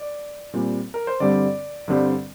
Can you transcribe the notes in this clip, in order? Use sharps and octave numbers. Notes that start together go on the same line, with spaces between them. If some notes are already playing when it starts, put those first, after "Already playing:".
Already playing: D5
A#2 G3 C4
A#4
C5
G2 D3 G3 C4 D5
G2 D3 G3 C4